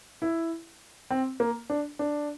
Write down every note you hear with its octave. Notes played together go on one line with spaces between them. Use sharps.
E4
C4
A#3
D4
D4